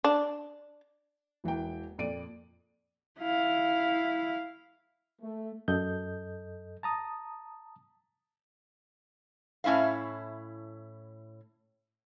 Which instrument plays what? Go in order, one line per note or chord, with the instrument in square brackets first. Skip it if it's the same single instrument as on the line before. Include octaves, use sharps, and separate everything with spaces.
[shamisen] D4
[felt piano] E1 E3 A#3 G5
F2 A#2 D5 D7 D#7
[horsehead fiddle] E4 F5
[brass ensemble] A3
[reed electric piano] F#2 A4 D#5 G6
A5 A#5 D#6
[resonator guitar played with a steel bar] A2 C#4 E4 E5 F5